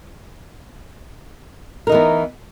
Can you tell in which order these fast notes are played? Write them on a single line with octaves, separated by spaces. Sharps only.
A#4 D#4 E3 B3